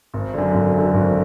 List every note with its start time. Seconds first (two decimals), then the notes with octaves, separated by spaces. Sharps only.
0.14 G#1
0.34 F#2 D3
0.54 G#1
0.74 F#2 D3
0.94 G#1